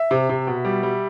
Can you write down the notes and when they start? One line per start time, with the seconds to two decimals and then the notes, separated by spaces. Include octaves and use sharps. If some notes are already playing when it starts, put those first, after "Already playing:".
Already playing: E5
0.11 C3
0.29 C3
0.47 B2
0.65 G3
0.83 G3